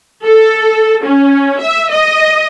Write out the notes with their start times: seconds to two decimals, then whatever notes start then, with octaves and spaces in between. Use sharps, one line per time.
0.25 A4
1.05 C#4
1.61 E5
1.91 D#5